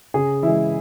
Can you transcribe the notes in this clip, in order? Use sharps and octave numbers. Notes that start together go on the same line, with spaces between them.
C#3 G#4
E3 G#3 E4 E5